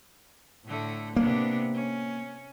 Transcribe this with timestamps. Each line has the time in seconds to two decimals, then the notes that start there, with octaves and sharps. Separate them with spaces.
0.65 A2 D3 A3
1.16 C3 A#3 B3 D4
1.74 C#4